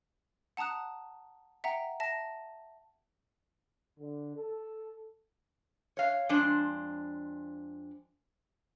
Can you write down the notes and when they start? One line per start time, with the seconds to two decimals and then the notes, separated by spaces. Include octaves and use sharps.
0.57 F#5 A5 A#5 D#6 F#6
1.64 E5 F#5 G5 A#5
2.00 E5 A5 A#6
3.99 D3
4.36 A4
5.97 C#5 F5
6.29 F2 G#3 D4 C5